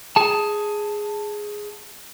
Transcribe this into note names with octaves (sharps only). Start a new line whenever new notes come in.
G#4 A5